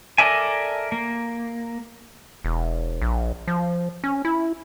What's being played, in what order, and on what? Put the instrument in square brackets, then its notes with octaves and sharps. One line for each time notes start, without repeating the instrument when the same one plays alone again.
[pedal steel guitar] A4 A#4 D5 E5 G#5
A#3
[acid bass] E1
A#1
F3
C#4
E4